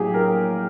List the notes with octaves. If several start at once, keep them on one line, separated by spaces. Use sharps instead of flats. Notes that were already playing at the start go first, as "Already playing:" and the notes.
Already playing: A#1 A2 F#3 G4 G#4
A#4